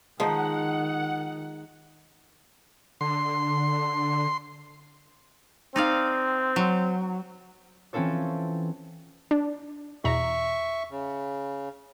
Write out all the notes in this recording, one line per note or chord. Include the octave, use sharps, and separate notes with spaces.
D#3 F3 G#3 D#4 F#5
D3 C6
C4 D#4 D5 F5
F#3
E3 C4 C#4 F4 A4 C#5
D4
E2 B2 E5 A#5 C#6
C#3